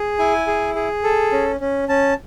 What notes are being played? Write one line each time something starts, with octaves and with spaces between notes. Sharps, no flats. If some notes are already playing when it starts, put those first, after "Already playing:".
Already playing: G#4
E4 G#5
G#4
G#4
A4
C#4
C#4
C#4 A5